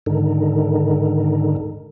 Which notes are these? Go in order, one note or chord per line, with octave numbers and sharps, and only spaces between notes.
G#2 D3 D#3